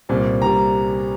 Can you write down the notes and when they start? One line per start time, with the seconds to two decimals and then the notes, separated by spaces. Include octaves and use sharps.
0.09 C2 A#2 G3 C4
0.42 A#2 G3 C4 A#5